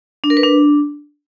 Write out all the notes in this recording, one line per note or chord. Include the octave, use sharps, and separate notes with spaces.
D4
A#4
B4
D4